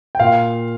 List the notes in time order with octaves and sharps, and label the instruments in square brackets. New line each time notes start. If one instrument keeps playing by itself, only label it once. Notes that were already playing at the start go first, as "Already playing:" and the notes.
[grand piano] G5
A#2 F5